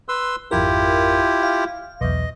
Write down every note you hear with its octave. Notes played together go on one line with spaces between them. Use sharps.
B4 C6 E6
G#1 F2 E4 F4 G4 A#4
F5
B1 E2 D#5